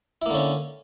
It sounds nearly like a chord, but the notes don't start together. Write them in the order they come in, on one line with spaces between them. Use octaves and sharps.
E4 A#3 D3 C#4